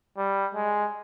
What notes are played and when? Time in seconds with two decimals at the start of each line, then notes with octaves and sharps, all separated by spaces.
0.17 G3
0.55 G#3